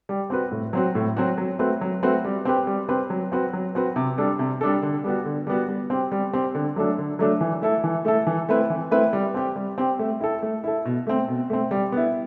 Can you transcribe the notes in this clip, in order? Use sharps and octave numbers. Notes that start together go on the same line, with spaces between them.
G3
C4 F#4 B4
A2
F#3 C4 F#4
A2
F#3 C4 F#4
F#3
A3 C4 F#4 B4
F#3
A3 C4 F#4 B4
G3
C4 G4 B4
G3
C4 G4 B4
F#3
C4 F#4 B4
F#3
C4 F#4 B4
C3
G3 D4 A4
C3
G3 D4 A4
D3
G3 B3 F#4
D3
G3 B3 F#4
G3
C4 G4
G3
C4 G4
D3
F#3 A3 D4 A4
D3
F#3 A3 D4 A4
E3
A3 E4 A4
E3
A3 E4 A4
E3
A3 C4 E4 B4
E3
A3 C4 E4 B4
G3
C4 G4
G3
C4 G4
A3
E4 A4
A3
E4 A4
B2
A3 C4
B2
A3 C4
G3
B3 E4